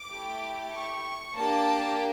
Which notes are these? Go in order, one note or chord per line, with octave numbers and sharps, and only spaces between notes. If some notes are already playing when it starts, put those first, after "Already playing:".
Already playing: D6
A3 E4 G4
C#6
A#3 D4 G4 A5